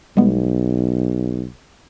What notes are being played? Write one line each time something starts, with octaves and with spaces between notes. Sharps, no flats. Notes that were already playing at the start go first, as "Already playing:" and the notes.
B1 G3 G#3 B3